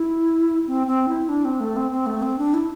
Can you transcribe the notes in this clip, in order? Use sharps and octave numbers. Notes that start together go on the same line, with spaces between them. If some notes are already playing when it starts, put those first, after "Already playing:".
Already playing: E4
C4
C4
E4
D4
C4
A3
C4
C4
A3
C4
D4
E4